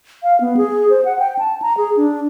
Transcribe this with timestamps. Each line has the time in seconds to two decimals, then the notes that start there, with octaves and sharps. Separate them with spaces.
0.23 F5
0.41 B3
0.57 G#4
0.90 C5
1.05 F#5
1.19 G5
1.39 A5
1.62 A#5
1.77 G#4
1.97 D4